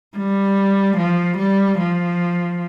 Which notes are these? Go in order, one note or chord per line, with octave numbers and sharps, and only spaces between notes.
G3
F3
G3
F3